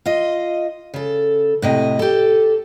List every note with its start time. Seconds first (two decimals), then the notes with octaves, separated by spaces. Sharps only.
0.06 F4 D#5
0.94 C#3 A4
1.62 A2 C3 D#5
1.99 G4 A4